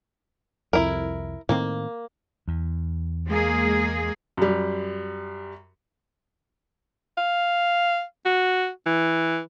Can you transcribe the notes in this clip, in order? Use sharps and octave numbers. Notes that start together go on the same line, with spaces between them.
C2 F2 E4 A#4
A2 D#3 A#3 C4
E2
G#3 A#3 G#4
F#2 G3
F5
F#4
E3